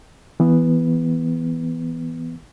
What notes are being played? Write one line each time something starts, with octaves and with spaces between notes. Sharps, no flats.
E3 B3